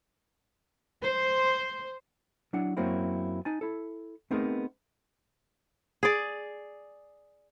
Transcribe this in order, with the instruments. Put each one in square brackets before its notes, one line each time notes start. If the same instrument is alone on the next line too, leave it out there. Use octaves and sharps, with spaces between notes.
[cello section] C5
[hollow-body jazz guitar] F#3 D4 E4 F#5
F#2 F#3 A#3 C4 E4
D#4 G#5 A5
E4 A4
A3 B3 C4 D#4 G#4 A#4
[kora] G#4 D5